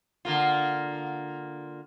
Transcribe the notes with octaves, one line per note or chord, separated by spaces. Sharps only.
D3 A#3 F4